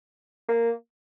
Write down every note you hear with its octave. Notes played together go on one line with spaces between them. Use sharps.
A#3